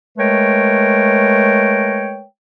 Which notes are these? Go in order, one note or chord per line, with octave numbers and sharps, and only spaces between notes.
G#3 A3 A#4 B4 C#5 G5